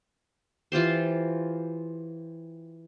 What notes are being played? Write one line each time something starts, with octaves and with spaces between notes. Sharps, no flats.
E3 F4 G4 C5